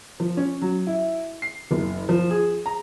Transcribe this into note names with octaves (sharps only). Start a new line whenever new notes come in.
F3
C#4
F#3
E4
C7
F#1
F3
G#4
A#5